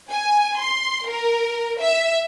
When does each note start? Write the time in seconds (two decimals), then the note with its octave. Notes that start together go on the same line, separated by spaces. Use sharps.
0.10 G#5
0.59 C6
1.09 A#4
1.81 E5